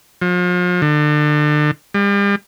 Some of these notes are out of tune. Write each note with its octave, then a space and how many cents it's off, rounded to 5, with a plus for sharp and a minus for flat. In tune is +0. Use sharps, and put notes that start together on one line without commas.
F3 +40
D3 +35
G3 +40